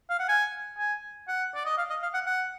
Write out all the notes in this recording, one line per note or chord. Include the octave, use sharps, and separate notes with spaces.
F5
F#5
G#5
G#5
F#5
D5
D#5
F5
D#5
F5
F#5
F#5